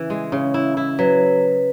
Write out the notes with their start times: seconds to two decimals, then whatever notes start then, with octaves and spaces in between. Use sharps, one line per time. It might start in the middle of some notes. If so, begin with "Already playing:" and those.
Already playing: C#3 E3
0.10 G#3
0.32 C#3
0.54 E4
0.77 E4
0.99 F#3 B4